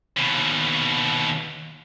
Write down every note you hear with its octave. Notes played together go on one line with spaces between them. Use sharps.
D#2 B2